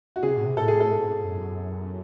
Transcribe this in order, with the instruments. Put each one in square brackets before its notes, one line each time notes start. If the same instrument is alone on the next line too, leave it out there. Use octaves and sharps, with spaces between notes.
[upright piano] F#4
[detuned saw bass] C#3 [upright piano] G#4
[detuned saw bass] C3
A2
C3
[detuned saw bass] A2 [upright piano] A4
[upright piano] G#4
A4
[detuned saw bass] G#2
F#2